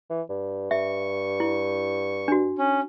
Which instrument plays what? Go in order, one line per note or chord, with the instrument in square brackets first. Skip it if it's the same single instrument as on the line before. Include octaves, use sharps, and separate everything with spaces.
[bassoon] E3
G2
[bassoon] G2 [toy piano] E5 [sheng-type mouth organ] C#6
[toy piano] E4
D4 F#4
[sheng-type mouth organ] C#4